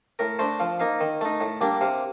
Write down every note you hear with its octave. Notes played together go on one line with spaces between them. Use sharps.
A2 A#4
A3 D4 C5
F3 F5
A#3 D#4 F5
D#3
A3 D#4
A2
G3 A#3 D4
C3 F5